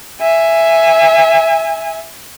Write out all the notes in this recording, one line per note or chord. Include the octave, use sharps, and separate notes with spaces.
E5 G#5